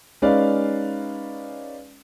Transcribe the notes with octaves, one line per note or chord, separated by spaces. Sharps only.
G#3 C#4 D#4 B4 D5 F5